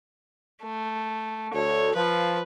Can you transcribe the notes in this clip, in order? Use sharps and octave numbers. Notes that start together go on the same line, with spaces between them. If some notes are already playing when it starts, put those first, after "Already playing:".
A3
D2 A4 C#5
F3 B4